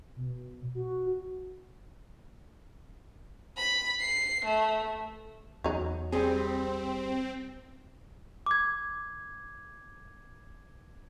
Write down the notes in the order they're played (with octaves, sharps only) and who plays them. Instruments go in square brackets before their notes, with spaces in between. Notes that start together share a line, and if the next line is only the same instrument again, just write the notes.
[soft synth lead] B2
F#4
[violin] B5
C7
A3
[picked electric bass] E2 B3 [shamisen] F#3 D#4
[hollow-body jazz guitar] G3 G#4 [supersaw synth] C4
[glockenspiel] D6 G#6